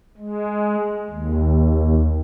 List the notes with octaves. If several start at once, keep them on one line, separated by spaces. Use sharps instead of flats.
G#3
D#2